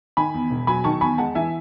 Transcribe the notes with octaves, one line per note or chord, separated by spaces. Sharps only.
D#3 G#5 B5
E2
E1
F#3 G#5 B5
D#3 A5 C#6
E2 G#5 B5
G#3 F#5 A5
E3 E5 G#5